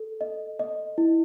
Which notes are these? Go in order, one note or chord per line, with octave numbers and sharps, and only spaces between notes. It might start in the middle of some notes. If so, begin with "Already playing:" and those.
Already playing: A4
D#5
D#5
E4